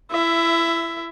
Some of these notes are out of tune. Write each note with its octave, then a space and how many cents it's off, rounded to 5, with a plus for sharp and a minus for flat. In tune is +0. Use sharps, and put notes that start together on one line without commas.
E4 +25 E5 +10